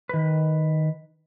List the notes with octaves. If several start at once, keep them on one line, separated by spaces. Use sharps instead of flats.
D#3 B4